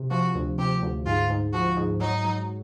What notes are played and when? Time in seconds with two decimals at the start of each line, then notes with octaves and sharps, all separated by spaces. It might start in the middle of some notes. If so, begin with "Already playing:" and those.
Already playing: C3
0.11 F3 F#4
0.35 D2
0.58 C3 G4
0.82 D2
1.06 G#2 F4
1.30 G#2
1.54 F3 F#4
1.77 G#2
2.01 F#3 D#4
2.25 F#3